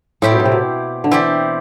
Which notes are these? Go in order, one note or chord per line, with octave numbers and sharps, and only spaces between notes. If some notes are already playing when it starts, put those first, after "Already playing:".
A2 C4 E4 G4 D5
B2
A2
C3
B2
D3
E3 C4 E4 G4 D5